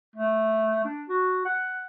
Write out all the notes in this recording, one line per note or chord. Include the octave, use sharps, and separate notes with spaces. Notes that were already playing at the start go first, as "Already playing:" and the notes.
A3
D4
F#4
F#5